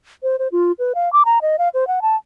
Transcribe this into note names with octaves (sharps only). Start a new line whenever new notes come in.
C5
C5
F4
B4
F5
D6
A#5
D#5
F5
C5
F#5
A5